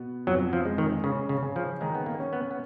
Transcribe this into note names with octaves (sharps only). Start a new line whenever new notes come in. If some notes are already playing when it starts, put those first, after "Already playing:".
Already playing: B2 B3
F2 F#3
F3
G#3
D#3
C#3 C#4
C#3
C#3
F3
D#3 G#3
B3
A#3
C#4
B3
B3